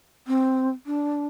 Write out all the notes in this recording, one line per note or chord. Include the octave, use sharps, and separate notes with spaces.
C4
D4